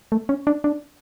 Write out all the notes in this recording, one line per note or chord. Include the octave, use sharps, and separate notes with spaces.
A3
C#4
D4
D4